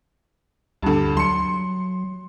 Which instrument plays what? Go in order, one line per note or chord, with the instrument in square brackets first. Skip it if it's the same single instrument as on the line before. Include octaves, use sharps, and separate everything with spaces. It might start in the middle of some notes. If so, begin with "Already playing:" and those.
[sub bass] D2 [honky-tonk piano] G2 D3
[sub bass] F#3 [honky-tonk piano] C6 C#7